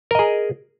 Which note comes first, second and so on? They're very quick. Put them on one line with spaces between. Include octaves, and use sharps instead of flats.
A#4 D#5 G#4